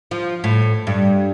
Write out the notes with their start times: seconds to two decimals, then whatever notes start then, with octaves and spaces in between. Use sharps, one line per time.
0.11 F3
0.44 A2
0.87 G2